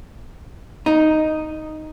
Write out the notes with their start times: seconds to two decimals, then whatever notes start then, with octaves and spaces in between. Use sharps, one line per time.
0.86 D#4